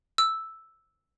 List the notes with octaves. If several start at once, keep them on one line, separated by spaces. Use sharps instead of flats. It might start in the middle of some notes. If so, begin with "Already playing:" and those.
E6